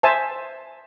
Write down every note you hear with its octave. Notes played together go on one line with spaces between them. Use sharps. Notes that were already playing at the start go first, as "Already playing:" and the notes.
C5 E5 G#5 A5